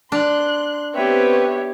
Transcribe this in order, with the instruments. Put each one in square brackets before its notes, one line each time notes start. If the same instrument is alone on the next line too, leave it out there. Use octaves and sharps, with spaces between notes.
[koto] D4 [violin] C6 F#6
[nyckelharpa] B3 G4 [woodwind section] C4 B4 [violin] C#5 E5